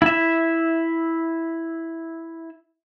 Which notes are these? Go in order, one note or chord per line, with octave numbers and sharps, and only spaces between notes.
E4 E5